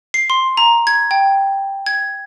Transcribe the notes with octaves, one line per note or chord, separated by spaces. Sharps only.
C7
C6
A#5
G#6
G5
G#6